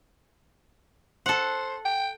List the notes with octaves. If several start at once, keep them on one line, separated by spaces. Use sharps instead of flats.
A4 C5 F#5
G5